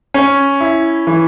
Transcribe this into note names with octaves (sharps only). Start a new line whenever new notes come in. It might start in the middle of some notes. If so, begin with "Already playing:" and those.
C#4
E4
E3